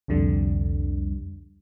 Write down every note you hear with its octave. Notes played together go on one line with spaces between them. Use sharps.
C2 F2 D3 G3